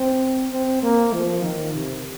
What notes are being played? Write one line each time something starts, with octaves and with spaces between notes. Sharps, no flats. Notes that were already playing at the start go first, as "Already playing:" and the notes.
Already playing: C4
C4
A#3
F3
D#3
C3